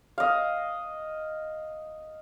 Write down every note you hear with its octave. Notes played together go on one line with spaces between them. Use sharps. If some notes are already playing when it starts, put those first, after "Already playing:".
D#5 F5